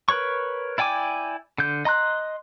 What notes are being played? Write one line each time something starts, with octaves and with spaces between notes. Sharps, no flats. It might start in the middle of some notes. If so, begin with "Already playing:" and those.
A#4 B4 C#5 C#6
E4 D5 G5 G#5 D6
D3 G6
D#5 A#5 C6 F#6